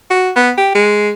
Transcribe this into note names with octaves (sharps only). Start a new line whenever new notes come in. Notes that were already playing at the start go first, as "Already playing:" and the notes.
F#4
B3
G4
G#3